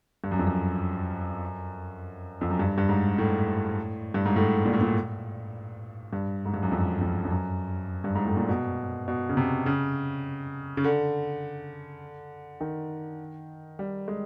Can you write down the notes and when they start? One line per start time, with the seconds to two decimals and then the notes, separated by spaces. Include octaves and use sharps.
0.24 G2
0.31 F#2
0.39 F2
0.47 F#2
2.41 F2
2.50 F#2
2.59 G2
2.78 G2
2.89 G#2
3.18 A2
4.14 G2
4.26 G#2
4.36 A2
4.65 A#2
4.73 A2
4.81 A#2
6.13 G2
6.45 G#2
6.54 G2
6.63 F#2
6.72 F2
7.01 F2
7.25 F2
7.31 F#2
8.04 G2
8.15 G#2
8.27 A2
8.37 A#2
8.49 B2
9.08 B2
9.29 C#3
9.37 C3
9.66 C#3
10.77 C#3
10.84 D3
12.61 D#3
13.79 G3
14.08 G#3